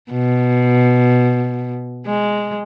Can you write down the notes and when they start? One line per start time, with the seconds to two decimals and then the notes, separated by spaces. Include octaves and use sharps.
0.12 B2
2.06 G#3